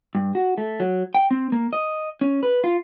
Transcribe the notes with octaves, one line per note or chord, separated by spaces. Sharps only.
G2
F#4
A3
F#3
G5
C4
A#3
D#5
C#4
B4
F4